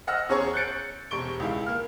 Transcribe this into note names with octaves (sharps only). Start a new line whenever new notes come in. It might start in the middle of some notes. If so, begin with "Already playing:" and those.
D#5 F#5 E6 F6 A#6
E2 C#4 G#4 C#5 A#5 C#6
F#6 G6 A6 C#7 D7
E1 C3 C#6 D7 G7
C#2 E4 F5
A#3 F6